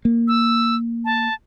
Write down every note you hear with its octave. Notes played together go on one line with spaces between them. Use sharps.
A#3
E6
A5